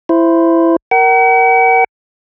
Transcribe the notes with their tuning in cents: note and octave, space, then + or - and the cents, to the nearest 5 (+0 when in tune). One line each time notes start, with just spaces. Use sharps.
E4 +15 C5 +0
A#4 +0 F#5 +45